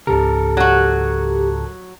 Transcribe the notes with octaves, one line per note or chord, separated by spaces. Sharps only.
C#2 G#2 C#3 G4 A4 A#4
F#3 F#4